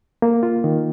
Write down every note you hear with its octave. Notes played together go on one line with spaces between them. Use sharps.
A#3
F4
D#3